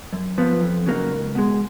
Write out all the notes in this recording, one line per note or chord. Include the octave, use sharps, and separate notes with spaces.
F#2
F3 B3 F4
F2
C#3 F#3 A#3 D#4
C#2
B2 G#3